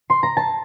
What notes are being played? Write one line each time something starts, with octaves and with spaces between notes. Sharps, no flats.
C6
A#5
A5